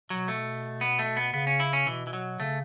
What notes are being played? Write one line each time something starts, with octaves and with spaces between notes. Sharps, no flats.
B2 F#3
A3
B3
A3
B3
C#3 B3
C#4
E4
C#4
B2 E3
E3
F#3
C#3 A3